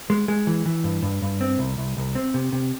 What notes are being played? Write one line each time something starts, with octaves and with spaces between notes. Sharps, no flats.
G#3
G#3
E3
E3
G2
G2
G2
C4
C2
C2
C2
C4
C3
C3